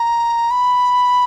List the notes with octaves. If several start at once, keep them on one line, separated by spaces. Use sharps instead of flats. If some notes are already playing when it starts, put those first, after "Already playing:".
Already playing: A#5
B5